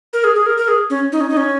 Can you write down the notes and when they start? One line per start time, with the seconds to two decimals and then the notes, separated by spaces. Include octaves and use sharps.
0.13 A#4
0.24 G#4
0.35 G#4
0.46 A#4
0.58 A#4
0.68 G#4
0.90 C#4
1.12 D#4
1.21 C#4
1.29 D#4
1.37 C#4